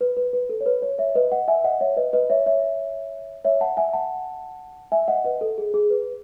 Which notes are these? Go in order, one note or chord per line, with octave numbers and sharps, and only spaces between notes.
B4
B4
B4
A4
C#5
B4
C#5
C#5 E5
B4 D#5
D#5 F#5
E5 G#5
D#5 F#5
C#5 E5
B4 D#5
B4 D#5
C#5 E5
C#5 E5
C#5 E5
F#5 A5
E5 G#5
F#5 A5
E5 G#5
D#5 F#5
B4 D#5
A4
G#4
G#4
B4